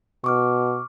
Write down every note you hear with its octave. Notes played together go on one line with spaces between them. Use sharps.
B2 C#6 D6 F6